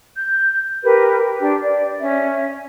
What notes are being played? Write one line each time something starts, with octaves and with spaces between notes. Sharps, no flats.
G6
G4 A#4 B4
D4 G4
D5
C#4 E5